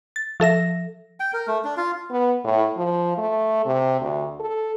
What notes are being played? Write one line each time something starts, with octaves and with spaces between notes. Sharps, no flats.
A6
F3 A4 E5 A#6
G5
A#4
A3
D4
F4
B3
A2
F3
A3
C3
D2
A4